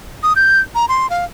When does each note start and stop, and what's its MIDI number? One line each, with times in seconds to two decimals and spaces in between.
0.23 0.33 87
0.36 0.60 91
0.75 0.85 82
0.89 1.09 84
1.10 1.25 77